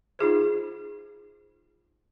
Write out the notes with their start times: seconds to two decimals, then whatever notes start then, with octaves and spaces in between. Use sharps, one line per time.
0.19 D#4 F4 G#4 C5